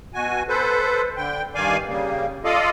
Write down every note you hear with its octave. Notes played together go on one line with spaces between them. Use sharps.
B2 F#4 G#5
A4 B4 C5
D3 G5
G2 D#3 D5 F5 G#5
C#3 G3 A#3
F4 A4 D5 D#5 F5